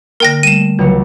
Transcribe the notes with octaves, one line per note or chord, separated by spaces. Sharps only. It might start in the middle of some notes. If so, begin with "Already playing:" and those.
D3 A#3 A#4 G5 A#6
G3 A3 D#7 E7
C#2 E3 F#3 C#5